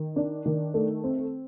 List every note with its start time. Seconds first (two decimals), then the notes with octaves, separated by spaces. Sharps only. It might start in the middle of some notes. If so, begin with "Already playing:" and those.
Already playing: D#3
0.16 D4
0.46 D#3
0.74 A3
1.04 C4